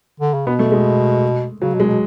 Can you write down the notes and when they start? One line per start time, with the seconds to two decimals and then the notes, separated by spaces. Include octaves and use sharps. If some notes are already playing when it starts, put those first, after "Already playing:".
0.20 D3
0.34 C#3
0.46 B2 B3
0.59 A3
0.72 G#3
1.61 C#3 F#3
1.74 B2
1.80 G#3
1.86 B2